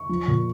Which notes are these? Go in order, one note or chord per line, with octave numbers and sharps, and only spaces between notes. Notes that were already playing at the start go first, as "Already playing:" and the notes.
Already playing: C#6
F3
A#2